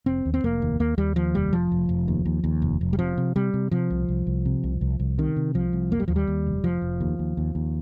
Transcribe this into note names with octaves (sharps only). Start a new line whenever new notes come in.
F1 C4
D#2
C4
F1 A#3
D#2
D#2 A#3
D#2 G3
D#2 F3
F1 G3
F1 F3
F1
F1
D#2
D#2
D#2
F1
F1
G3
C3 F3
C3
C3 G3
C3
C3 F3
C2
C2
C2
C3
C2
C2
C2
C3 D#3
C3
C2 F3
C2
F1 A#3
G3
D#2 F3
G3
D#2
F1
F1 F3
F1
D#2
D#2
D#2
D#2